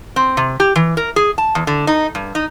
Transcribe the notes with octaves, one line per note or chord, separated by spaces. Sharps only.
C4
C3
G4
E3
A#4
G#4
A5
E2
D3
D#4
G2
D#4